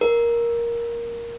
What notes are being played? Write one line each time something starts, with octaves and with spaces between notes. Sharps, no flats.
A#4